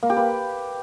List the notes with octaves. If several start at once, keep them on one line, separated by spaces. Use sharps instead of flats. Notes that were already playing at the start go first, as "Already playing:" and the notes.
A#3
G4
B4